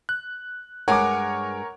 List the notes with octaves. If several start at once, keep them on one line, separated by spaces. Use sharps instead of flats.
F#6
G2 G#3 A#4 C#5 F#5 G#5 C#6 D6